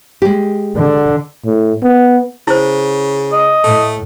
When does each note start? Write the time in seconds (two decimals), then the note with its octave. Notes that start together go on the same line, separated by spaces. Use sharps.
0.22 G#3 G4
0.76 D3
1.46 A2
1.83 B3
2.47 C#3 E4 C5
3.32 D#5
3.64 A2 A3